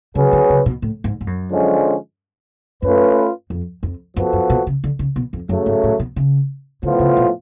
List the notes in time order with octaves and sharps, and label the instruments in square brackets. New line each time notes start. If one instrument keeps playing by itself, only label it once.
[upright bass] C#3 [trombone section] F#3 C#4 G#4 B4
[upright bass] D3
C#3
B2
A2
G#2
G#2
F#2
[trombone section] D3 F3 G#3 C#4
[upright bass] F#2 [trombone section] A3 C#4 F4 B4
[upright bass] F2
F2
[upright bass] F#2 [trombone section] F3 B3 F#4 A4
[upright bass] F#2
B2
C#3
D3
C#3
B2
F2
[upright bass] F#2 [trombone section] C#3 F#3 A3
[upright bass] G#2
A2
B2
C#3
[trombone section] A2 F3 B3 F4 [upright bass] D3
[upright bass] C#3
B2